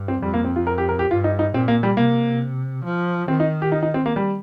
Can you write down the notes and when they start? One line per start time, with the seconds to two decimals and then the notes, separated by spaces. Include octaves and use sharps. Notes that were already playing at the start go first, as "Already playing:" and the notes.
Already playing: G2
0.08 C4
0.22 F2 G3
0.34 A#3
0.45 C4
0.56 F4
0.67 A#4
0.78 G4
0.89 A#4
0.99 G4
1.11 G2 F4
1.24 D#4
1.39 D#4
1.54 A#2 C4
1.68 A#3
1.83 G3
1.97 C3 A#3
2.85 F3
3.28 D#3 C4
3.40 D#4
3.62 G4
3.72 D#4
3.83 D#4
3.94 C4
4.06 A#3
4.16 G3